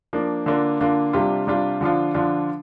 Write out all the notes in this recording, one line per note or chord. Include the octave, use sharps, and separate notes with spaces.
F3 A#3 D4
D3 A#3 D4 F4
D3 A#3 D4 F4
C3 G3 D4 F4
C3 G3 D4 F4
D3 F3 D4 F4
D3 F3 D4 F4